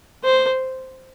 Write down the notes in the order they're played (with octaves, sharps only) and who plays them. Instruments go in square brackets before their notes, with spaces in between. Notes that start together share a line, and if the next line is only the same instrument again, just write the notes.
[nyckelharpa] C5